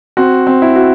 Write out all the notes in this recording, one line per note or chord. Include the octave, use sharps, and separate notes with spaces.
C4 F#4
C4
E4
F#4